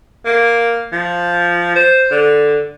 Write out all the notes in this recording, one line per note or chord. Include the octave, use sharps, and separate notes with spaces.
A#3
F3
C5
D3